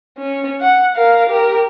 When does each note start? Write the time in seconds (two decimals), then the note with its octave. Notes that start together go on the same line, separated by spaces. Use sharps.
0.18 C#4
0.61 F#5
0.96 A#4 F5
1.30 G4 A#4